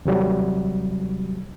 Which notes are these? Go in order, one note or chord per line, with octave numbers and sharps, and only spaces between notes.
D#2 C3 F#3 G3